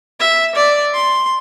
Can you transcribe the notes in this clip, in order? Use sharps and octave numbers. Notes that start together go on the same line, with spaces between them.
E5
D5
C6